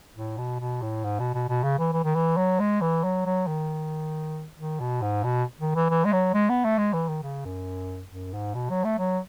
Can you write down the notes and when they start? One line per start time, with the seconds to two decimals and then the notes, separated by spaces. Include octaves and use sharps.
0.16 A2
0.38 B2
0.60 B2
0.82 A2
1.04 G#2
1.20 B2
1.35 B2
1.49 B2
1.64 C#3
1.79 E3
1.93 E3
2.05 D#3
2.15 E3
2.37 F#3
2.60 G#3
2.81 E3
3.04 F#3
3.26 F#3
3.48 D#3
4.58 D#3
4.80 B2
5.02 G#2
5.24 B2
5.61 D#3
5.75 E3
5.90 E3
6.05 G#3
6.13 F#3
6.34 G#3
6.50 B3
6.65 A3
6.78 G#3
6.93 E3
7.09 D#3
7.23 C#3
7.45 F#2
8.11 F#2
8.34 G#2
8.55 B2
8.70 F#3
8.84 A3
8.99 F#3